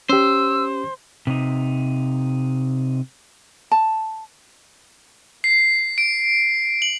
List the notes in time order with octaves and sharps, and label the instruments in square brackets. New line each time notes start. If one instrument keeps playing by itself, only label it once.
[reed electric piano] C#4 G4 [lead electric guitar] C5 [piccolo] E6
[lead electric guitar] C3 D#4
[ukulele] A5
[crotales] C7
D7
F#7